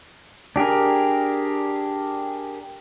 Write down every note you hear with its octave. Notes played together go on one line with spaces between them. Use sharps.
D4 G4 G#4 A#4